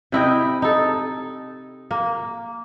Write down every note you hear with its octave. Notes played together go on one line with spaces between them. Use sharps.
C3 E4 D#5 G5
D#4 A4
A#3